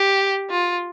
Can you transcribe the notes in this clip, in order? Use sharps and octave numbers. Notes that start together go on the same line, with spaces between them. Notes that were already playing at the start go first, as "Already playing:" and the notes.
Already playing: G4
F4